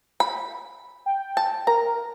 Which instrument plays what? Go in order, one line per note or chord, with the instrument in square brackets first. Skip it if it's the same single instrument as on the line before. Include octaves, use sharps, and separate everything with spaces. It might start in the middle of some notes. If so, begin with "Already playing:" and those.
[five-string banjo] B5
[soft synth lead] G5
[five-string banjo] A5
[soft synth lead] A#4 [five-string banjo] A#5